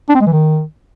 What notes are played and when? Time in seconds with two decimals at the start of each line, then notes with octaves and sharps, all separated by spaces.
0.09 D4
0.15 C4
0.21 G#3
0.27 E3
0.33 D#3